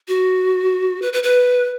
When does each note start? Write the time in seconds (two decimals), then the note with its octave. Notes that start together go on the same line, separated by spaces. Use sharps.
0.08 F#4
1.02 B4
1.13 B4
1.23 B4